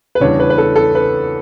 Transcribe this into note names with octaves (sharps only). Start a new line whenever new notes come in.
B4
E2 C#3 G3 D4 C#5
B4
B4
A4
A4
B4